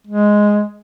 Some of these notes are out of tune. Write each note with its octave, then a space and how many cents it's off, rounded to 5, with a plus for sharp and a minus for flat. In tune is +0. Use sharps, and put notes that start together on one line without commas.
G#3 +0